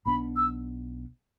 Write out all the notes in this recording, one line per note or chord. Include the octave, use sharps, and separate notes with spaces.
B1 B2 B3 D4 B5
E6